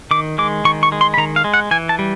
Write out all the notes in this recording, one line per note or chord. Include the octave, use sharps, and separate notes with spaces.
D#3 D6
G#3 D6
D#3 C#6
C#6
G#3
C6
B5
D#3 A#5
F5
G#3
F#5
E3 G#5
A5
G3